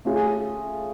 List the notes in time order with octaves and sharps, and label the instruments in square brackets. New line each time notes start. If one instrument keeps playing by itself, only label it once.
[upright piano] A3 C#4 F4 G#4